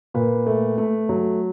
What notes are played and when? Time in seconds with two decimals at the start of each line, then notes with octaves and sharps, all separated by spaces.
0.14 A#2 B4
0.46 A3
0.78 A3
1.09 F#3